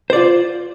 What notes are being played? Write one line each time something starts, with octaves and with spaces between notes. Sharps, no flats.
F4 C5 D5